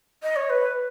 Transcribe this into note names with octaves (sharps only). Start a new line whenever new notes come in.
D#5
C#5
B4